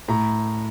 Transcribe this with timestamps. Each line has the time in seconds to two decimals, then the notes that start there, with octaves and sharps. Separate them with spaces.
0.08 A2 A#5